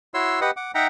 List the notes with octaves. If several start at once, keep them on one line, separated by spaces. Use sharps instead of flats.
E4 F#4 C#5 C6 E6
G4 B4 D#5 F#5
F#5 D6
D#4 E5 F#5 G5 A#5